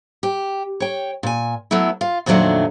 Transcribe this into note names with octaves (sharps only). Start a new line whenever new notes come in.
G4
C#5 G5
A#2 G#5
F#3 A3 B3 E4
F4
F2 A#2 D#3 F#3 A3 D4